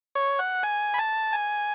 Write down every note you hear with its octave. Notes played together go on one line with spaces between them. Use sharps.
C#5
F#5
G#5
B5
A5
G#5